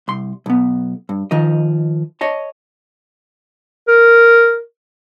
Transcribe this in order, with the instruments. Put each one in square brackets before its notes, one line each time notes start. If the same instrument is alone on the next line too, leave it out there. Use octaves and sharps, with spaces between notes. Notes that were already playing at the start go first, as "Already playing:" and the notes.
[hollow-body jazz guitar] C2 C6
B1 B3
G2
D#3 F3 D#5
C#5 D#5 A5
[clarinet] A#4